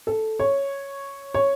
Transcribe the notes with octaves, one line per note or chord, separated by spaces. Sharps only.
A4
C#5
C#5